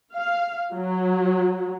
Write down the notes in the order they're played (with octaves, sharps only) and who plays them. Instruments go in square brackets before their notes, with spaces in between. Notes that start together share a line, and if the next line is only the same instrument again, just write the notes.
[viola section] F5
F#3